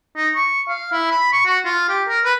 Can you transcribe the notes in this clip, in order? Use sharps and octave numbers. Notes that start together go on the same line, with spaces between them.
D#4
C#6
F5
E4
B5
C#6
F#4
F4
G4
A#4
B4